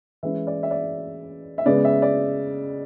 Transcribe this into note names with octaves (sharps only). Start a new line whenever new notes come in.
E3 G#3 C#4 E5
D5
E5
D5
E5
C#3 G#3 B3 D5
E5
D5